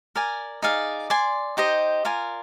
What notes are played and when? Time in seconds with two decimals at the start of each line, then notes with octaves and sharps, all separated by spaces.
0.16 A#4 D5 G#5
0.62 D#4 G#4 D5 F5
1.10 D5 G#5 C6
1.57 D#4 G4 C5 D#5
2.05 F4 A#4 D5 G#5